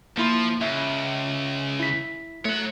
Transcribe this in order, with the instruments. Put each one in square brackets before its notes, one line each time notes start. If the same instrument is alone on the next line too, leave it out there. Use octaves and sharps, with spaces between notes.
[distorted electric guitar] F3 [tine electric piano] A#3 E4 C6
[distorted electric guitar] C#2 [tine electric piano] E5
[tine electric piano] E4 B6
[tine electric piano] A3 [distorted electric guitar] C#5 F#5